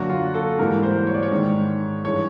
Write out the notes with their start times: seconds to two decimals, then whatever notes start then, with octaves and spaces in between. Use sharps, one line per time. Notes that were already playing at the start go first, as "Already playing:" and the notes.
Already playing: F#2 D3 F#3 A#3 F#4
0.10 F4
0.34 A4
0.59 G#2 E3 G3 A#3 A#4
0.83 C5
1.07 C#5
1.14 D5
1.23 C#5
1.31 G#2 D#3 G#3
2.04 G2 E3 G#3 C#5